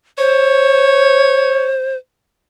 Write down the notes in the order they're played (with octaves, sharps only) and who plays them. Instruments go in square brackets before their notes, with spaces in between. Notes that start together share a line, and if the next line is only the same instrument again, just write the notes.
[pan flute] C5 [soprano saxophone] C#5